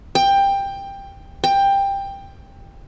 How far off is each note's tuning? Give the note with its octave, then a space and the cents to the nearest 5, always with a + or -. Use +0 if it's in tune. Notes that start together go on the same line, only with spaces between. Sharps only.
G5 +15
G5 +15